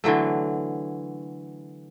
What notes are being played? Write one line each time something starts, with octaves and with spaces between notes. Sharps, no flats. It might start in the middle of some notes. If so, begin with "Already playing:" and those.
D3 E3 F#3 A3